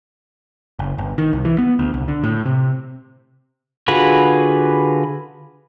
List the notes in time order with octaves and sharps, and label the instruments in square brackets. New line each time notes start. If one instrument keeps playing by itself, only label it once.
[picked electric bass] F#1
G1
D#3
C2
E3
B3
D2
C2
D3
A2
C3
[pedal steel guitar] D3 F4 F#4 G#4 B4